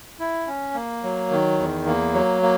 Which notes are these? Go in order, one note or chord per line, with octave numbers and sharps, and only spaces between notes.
E4
C#4
A#3
F#3
D#3
E2
A#3
F#3
A#3